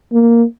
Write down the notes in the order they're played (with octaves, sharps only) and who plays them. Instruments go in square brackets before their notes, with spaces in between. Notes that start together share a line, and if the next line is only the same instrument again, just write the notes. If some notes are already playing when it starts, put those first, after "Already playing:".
[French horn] A#3